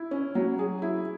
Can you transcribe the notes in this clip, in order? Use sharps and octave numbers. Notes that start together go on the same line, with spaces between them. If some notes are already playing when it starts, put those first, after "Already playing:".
Already playing: E4
C#4
F#3
G#4
E4